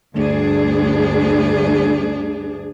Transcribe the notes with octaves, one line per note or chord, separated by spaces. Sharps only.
D2 G2 D4 G#4